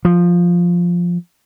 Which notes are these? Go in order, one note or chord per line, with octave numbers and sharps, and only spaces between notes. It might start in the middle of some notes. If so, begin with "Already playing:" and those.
F3